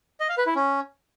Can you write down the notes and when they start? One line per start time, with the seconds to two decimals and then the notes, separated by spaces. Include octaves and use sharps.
0.20 D#5
0.29 F5
0.38 B4
0.46 E4
0.55 C#4